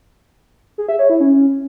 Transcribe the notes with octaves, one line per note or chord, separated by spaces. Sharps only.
G#4
E5
C#5
E4
C#4